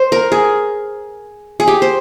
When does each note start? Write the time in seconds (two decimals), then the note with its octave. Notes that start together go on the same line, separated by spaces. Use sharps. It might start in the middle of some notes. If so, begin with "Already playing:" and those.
Already playing: C5
0.12 A#4
0.32 G#4
1.60 G#4
1.68 G4
1.82 C5